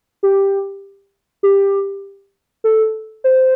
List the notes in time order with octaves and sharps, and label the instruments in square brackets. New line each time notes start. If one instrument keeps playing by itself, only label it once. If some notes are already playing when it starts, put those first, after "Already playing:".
[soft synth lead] G4
G4
A4
C5